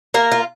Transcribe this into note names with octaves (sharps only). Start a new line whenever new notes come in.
A#3 A#4
F4